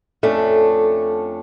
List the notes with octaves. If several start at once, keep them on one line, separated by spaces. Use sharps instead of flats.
F2 A3 C#4 D4